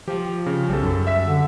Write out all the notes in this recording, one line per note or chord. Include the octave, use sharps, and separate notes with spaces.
F3 G4
C#3
B1 G3 A4
F#2
E5 E6 B6
D3